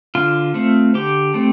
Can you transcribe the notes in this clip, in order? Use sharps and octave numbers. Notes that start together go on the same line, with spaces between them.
D3 F4
A3 C4
D3 G4
A3 C4